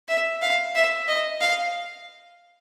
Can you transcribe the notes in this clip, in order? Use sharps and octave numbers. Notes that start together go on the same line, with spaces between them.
E5
F5
E5
D#5
F5